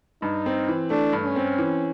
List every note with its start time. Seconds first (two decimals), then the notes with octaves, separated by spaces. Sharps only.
0.22 G2 D#4
0.46 C4
0.68 E3
0.90 A3 D4
1.13 G2
1.25 C#4
1.36 C4
1.59 E3